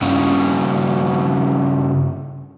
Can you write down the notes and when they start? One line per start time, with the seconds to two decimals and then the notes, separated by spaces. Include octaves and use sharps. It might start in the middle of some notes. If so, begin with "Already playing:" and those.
0.02 G2 C#3